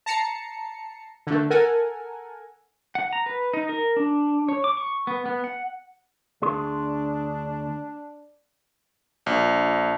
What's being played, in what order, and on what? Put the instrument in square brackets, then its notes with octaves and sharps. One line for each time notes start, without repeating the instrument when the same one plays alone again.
[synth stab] A5 A#5 C7 C#7
D3 A3
A4 A#4 F#5 G#5
[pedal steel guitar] F#5
A#5
B4
D#4
A#4
D4
C#5
D6
C#6
B3
B3
F#5
[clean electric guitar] D2 G#4 C6 [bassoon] D4
[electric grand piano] A#1